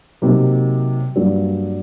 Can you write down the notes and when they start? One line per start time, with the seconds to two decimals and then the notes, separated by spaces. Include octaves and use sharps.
0.22 C3 F#3 A#3 D#4
1.16 G2 F#3 A#3 D4